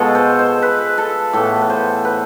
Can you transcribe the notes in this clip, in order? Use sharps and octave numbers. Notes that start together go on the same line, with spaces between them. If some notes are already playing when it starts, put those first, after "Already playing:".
Already playing: B2 G#3 B3 F4 A4
C5
C5
B4
A4
A2 E3 B3 A4
B4
C5
B4